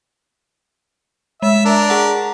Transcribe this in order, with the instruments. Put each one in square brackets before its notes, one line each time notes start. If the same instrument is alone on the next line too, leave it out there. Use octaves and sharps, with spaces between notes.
[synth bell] G#3 [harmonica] E5
[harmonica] D4 A#4
[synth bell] G#4 F#5